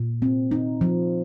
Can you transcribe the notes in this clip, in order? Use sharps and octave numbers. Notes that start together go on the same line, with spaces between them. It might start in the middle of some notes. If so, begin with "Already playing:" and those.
Already playing: A#2
C4
D#4
F3